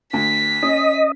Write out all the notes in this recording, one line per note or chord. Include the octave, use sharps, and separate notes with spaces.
D2 B6
C#4 D#5